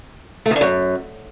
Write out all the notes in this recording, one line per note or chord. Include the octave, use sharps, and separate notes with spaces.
A3
D#3
D3
F#2